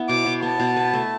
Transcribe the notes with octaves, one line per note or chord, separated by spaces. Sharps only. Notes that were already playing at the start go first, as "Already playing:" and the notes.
Already playing: B3 E4
B2 D6
B2
B3 A5
B2
B4
A3